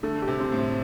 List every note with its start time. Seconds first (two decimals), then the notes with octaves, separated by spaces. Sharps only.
0.03 D3 A3
0.22 G4
0.28 C3
0.40 C4
0.52 A2
0.58 C4